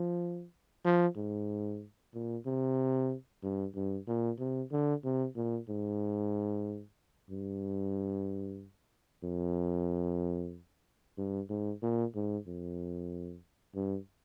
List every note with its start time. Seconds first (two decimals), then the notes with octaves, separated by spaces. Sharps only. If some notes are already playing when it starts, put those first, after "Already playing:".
Already playing: F3
0.85 F3
1.16 G#2
2.14 A#2
2.46 C3
3.43 G2
3.75 G2
4.07 A#2
4.39 C3
4.72 D3
5.04 C3
5.36 A#2
5.69 G#2
7.30 G2
9.24 F2
11.18 G2
11.49 G#2
11.82 A#2
12.15 G#2
12.47 F2
13.75 G2